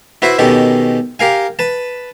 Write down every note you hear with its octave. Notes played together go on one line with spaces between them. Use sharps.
E4 F#4 B4 C5 E5
B2 D#3 C#4 G4 A4
G4 A#4 F5 G#5
B4 A5